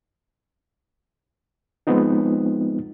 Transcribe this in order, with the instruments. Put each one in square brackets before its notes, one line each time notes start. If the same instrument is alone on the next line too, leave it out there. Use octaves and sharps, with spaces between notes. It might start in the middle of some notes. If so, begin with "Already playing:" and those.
[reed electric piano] F3 G#3 B3 C4 D#4 F4